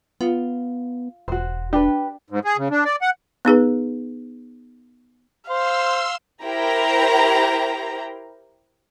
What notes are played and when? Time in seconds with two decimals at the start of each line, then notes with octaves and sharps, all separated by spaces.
0.21 B3 F4
1.28 E1 F#4 C5
1.73 D4 G4 B4
2.30 G#2
2.45 G#4
2.58 C#3
2.71 D4
2.85 D5
3.02 F#5
3.45 B3 D#4 G#4 B4
5.50 C5 F5 C6 E6
6.44 E4 G4 A#4 C5 G5 A#5